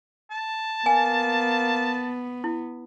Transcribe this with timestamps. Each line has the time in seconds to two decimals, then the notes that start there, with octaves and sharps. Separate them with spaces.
0.31 A5
0.86 A#3 B3 G#5
2.44 E4